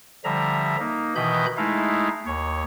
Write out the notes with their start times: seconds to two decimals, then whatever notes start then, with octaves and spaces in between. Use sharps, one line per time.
0.24 D3 F3 G3 E5 A#5
0.79 A#3 D#4
1.15 B2 D#3 E3 D#5 B5 G6
1.57 G#3 A3 D#4 E4 F5
2.26 D#2 C#5